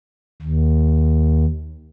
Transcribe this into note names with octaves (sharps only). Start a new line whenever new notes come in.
D#2